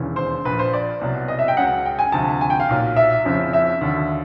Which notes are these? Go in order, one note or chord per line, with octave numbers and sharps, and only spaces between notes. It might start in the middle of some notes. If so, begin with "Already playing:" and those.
Already playing: E1 D#2 C#3 E3
C5
A#1 A#2 F3 B4
C5
D5
C2 B2 F#3
D#5
E5
G5
C#2 C#3 F#3 F#5
G5
G#5
D2 C3 F3 A5
G#5
G5
F5
B1 A#2 F#3
E5
F#1 F2 C#3 F3
E5
D#2 D3 F#3